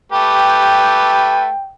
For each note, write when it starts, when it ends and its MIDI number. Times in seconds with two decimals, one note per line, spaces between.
0.12 1.50 57
0.12 1.50 67
0.12 1.50 71
0.12 1.74 79